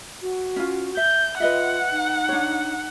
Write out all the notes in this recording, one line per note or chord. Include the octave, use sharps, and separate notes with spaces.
F#4
C#4 F4
E5 G6
F4 B4 D#5 E5 F#5
D#4
D4 C#5